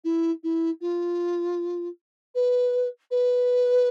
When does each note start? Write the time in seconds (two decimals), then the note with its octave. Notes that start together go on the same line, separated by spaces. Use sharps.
0.04 E4
0.43 E4
0.81 F4
2.35 B4
3.11 B4